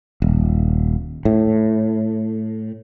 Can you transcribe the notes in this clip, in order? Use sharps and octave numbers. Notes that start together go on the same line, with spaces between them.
D#1
A2